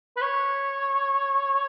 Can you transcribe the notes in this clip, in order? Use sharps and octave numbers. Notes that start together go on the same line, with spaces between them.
B4
C#5